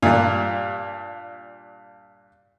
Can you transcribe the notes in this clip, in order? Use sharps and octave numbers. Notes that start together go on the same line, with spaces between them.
G2 A#2